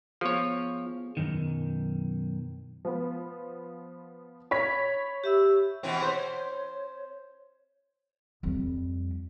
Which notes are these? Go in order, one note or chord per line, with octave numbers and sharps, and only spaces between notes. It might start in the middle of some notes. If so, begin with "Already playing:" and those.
F3 B3 G#4 C#5
B1 F#2 D#3
F3 B3
C#5 B5 B6
G4 E5 E6
B2 E3 C4
C5 C#5
F2 G3